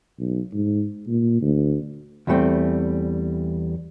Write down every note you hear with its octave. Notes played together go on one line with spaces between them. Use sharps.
B1
G#2
A#2
D2
E2 E3 G3 A3 C4